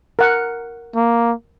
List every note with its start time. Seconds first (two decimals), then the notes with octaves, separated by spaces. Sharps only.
0.19 A#4 F#5
0.95 A#3